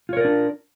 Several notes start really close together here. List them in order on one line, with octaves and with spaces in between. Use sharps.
F4 C#5 A#4 D5 D4